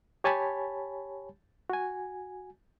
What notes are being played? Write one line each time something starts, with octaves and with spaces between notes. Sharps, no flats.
G4 C#5 G#5 A5 B5
F#4 G#5